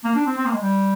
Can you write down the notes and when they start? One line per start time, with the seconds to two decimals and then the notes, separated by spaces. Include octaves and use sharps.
0.04 A#3
0.16 D4
0.26 C4
0.37 C4
0.46 A#3
0.53 G#3
0.61 G3